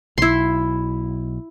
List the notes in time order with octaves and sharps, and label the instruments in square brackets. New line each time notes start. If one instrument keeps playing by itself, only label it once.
[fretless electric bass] B1 [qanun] E4 C6